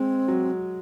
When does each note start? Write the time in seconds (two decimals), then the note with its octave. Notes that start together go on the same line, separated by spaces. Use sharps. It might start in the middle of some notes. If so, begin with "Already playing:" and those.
Already playing: G#3 C4
0.28 F#3